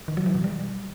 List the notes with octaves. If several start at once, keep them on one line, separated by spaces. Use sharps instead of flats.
D#3
F#3
E3
B2
G3